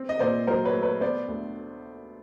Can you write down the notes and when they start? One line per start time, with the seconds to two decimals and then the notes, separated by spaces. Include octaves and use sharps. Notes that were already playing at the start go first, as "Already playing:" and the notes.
Already playing: C4
0.09 D#5
0.19 A#2 C5 D5
0.47 F#3 A#4 C5
0.65 B4 C#5
0.74 A3
0.83 B4 C#5
1.01 B3 C5 D5
1.28 D2